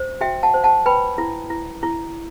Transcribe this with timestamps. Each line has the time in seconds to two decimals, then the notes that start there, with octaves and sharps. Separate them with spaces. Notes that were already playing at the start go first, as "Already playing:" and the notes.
Already playing: C5
0.21 F#4 E5 G5
0.43 F#5 A5
0.54 C5
0.63 F#5 A5
0.86 B4 G5 B5
1.18 E4
1.50 E4
1.83 E4